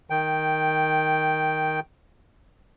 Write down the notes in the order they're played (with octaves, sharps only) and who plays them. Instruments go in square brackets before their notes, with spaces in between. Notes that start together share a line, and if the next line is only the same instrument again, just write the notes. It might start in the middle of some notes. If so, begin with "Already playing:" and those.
[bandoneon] D#3 G5